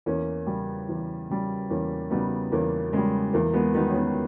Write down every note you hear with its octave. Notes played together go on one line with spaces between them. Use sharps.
E2 A#3 C#4
C#3 G3
E2
C#3 G3
E2 A#3 C#4
C#3 G3 B3 D#4
E2 A#3 C#4
C#3 G3 G#3
E2 A#3
G#3 B3
D#3 G3 B3 D#4
C#4
B3 D#4